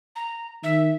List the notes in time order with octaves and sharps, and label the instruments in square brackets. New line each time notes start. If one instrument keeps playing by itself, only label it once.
[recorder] A#5
[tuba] D#3 [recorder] E5